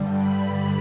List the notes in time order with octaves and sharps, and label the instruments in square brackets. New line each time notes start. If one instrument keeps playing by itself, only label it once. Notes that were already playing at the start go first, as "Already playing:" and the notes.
Already playing: [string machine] G2 D3 G3
B5